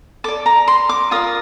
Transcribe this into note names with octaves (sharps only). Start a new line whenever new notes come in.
A4 D5 D6
A#5
C6
D6
F4 A#4 D5 D#6